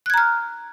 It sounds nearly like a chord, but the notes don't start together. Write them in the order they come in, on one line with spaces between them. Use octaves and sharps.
F#6 G#6 A#5 F6